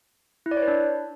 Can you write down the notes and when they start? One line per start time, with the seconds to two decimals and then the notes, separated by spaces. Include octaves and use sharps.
0.46 E4
0.51 D5
0.57 C#5
0.62 B4
0.68 D4